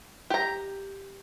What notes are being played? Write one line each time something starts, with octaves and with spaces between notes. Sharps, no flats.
G4 A#5